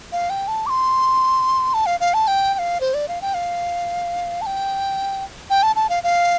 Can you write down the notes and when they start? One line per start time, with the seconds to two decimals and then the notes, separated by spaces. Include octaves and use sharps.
0.12 F5
0.30 G5
0.48 A5
0.66 D6
0.70 C6
1.74 A5
1.86 F5
2.00 F5
2.14 A5
2.28 G5
2.54 G5
2.59 F5
2.81 C5
2.94 D5
3.08 F5
3.22 G5
3.34 F5
4.41 A5
4.46 G5
5.50 G5
5.63 A5
5.76 A5
5.89 F5
6.04 F5